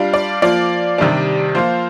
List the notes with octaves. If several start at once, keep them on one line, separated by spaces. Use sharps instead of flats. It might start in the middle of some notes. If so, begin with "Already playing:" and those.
Already playing: G3 D4 F4
D5
F3 A#3 F4 D5
C3 D#3 G3 D4
F3 A#3 F4 C5